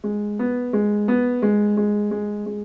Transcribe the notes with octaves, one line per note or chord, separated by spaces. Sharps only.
G#3
B3
G#3
B3
G#3
G#3
G#3
G#3